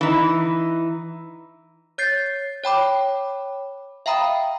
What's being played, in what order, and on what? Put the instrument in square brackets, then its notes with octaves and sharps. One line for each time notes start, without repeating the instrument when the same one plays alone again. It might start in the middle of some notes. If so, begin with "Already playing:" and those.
[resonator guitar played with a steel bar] E3 D#4
[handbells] C#5 G6 A6 C7
C#5 G5 B5 D6
E5 F5 G5 A#5 B5 D#6